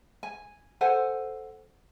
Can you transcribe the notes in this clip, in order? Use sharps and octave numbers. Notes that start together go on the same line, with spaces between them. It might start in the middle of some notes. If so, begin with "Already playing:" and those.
G#5
A4 C5 F#5 G#5